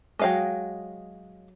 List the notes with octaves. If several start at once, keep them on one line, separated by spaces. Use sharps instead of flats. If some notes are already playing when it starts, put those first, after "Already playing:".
F#3 G#3 D#5 F5 G5